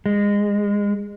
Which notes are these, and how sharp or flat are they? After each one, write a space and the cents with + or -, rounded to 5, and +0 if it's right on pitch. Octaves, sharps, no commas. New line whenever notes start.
G#3 -25